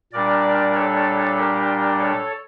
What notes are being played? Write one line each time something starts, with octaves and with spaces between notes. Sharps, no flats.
A#2 G3 D4 A#4 D5
A4 C#5
G4 A#4
A4 C#5